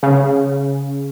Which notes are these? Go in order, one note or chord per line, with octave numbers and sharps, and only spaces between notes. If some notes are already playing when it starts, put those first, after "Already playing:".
C#3